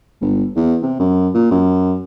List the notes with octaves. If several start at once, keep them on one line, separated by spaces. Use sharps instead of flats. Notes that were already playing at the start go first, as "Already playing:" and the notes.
G1
E2
C3
F#2
A#2
F#2